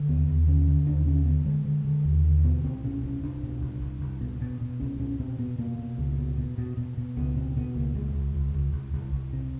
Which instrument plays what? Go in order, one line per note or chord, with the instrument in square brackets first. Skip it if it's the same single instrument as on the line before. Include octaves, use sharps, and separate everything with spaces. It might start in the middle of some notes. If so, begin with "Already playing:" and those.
Already playing: [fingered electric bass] D3
D#2 B3
D#2
D3 C#4
D3
D#2 D4
D3 C#4
D3 B3
D3 G#3
D3
D3
D#2
D3
B2 B3
C2 C4
B2 C#4
C2 C#4
C2 D4
B2
C2
C2
C2
B2
B2
B2
C2 C#4
B2 C#4
B2 C4
B2 B3
B2 A#3
B2
C#2
B2
B2
B2
B2
B2
C#2 B3
B2 C4
B2 B3
C#2 A#3
C#2 G#3
C#2
C#2
C#2
C2
C2
C2
C3